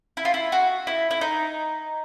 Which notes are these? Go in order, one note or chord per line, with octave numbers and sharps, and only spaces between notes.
E4
F4
E4
F#4
E4
E4
D#4